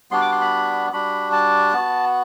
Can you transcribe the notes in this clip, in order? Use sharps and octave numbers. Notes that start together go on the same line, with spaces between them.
G3 B3 D4 F#4 C6
D6
C6
B5
G3 D4 F#4 B5
A5
B3 F#4